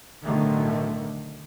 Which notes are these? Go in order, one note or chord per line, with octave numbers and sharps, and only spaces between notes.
B1 A2 D3 D#3 A3